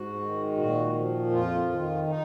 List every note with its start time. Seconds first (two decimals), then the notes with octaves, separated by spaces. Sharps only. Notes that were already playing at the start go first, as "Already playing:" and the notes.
Already playing: G#2 F#4
0.19 D#3
0.57 A#2 F#4
0.94 F3
1.31 F2 F4
1.70 D#3
2.07 D#4